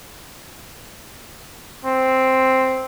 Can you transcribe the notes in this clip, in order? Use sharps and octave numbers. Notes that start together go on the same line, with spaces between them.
C4